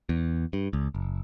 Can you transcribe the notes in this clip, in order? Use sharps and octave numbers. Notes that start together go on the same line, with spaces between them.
E2
G2
C#2
F#1